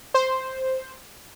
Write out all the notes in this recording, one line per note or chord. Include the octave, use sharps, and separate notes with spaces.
C5